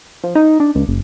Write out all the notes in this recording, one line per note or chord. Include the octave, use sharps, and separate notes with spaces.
F3
D#4
D4
C#2
F#1